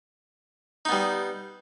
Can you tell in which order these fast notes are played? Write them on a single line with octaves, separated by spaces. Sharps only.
D#4 B3 G3